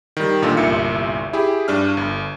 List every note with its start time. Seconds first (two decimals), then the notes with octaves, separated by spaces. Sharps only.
0.17 D#3 G3
0.42 A1 A#2 D4 D#4 F4 A4
0.57 G1 C2 A#2 E5 C#7
1.33 E4 G4 G#4
1.68 G2 D4 F6
1.97 G1